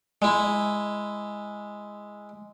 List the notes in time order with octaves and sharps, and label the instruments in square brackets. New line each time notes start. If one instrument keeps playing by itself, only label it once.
[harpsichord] G#3 E4